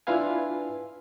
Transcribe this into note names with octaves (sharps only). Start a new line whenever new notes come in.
D4 E4 F4 B4 F5 G#5